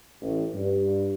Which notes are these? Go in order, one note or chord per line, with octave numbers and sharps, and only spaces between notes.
A1
G2